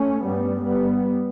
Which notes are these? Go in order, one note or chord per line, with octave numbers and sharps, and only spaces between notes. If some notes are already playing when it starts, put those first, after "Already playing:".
Already playing: A3 C#4
G2 G3 B3
G3 B3